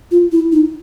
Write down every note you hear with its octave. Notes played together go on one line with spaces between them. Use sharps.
F4
E4
D#4